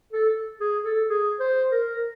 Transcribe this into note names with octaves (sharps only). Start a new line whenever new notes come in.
A4
G#4
A4
G#4
C5
A#4